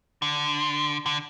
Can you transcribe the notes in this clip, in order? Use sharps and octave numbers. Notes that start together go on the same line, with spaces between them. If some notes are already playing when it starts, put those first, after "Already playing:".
D3
D3